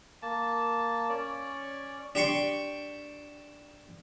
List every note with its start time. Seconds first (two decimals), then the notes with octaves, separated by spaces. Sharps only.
0.22 A#3 A5
1.09 C#4 D5
2.15 D4 G4 G5 C6 C#6